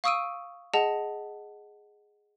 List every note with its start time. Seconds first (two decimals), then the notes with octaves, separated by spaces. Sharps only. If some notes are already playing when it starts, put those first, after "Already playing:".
0.04 F5 C#6 D#6 E6 D7 D#7
0.74 G#4 D#5 F#5 A5